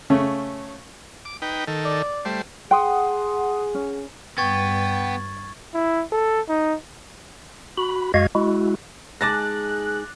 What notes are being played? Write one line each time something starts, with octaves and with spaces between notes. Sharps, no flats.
C#3 A3 C#4
D6
D#4 B4 G5
D#3 A4
D5
G3 A3 C5
G#4 F#5 G5 C6 D#6
C#4
G2 B3 G5 C#6 G#6 A6
E4
A4
D#4
F#4 B5
F#2 G#3 F#4 D#5 F5 G#6
G#3 E4 F#4
G#3 D#4 G#4 A5 D6 F#6 A6 A#6